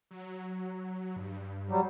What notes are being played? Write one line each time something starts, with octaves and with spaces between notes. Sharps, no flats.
F#3
G2
F#3 G3